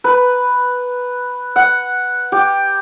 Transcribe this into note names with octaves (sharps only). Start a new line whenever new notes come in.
B4
F#5
G4